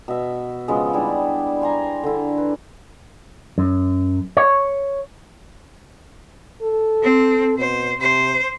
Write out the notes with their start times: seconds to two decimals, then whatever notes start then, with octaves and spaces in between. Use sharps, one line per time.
0.08 B2 E5
0.68 C#3 F3 G#3 B3
0.93 G3 D4 E4 B5
1.62 C5 G#5 A#5
2.03 D3 E4
2.38 B4
3.58 F#2
4.37 C#5
6.62 A4
7.03 C4
7.58 B2 C5
8.00 C3 C5